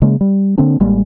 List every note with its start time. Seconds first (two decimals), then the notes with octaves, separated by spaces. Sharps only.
0.02 C#3 G#3 A#3
0.21 G3
0.58 D3 A#3 C4 D4
0.80 A1 G3 G#3 A#3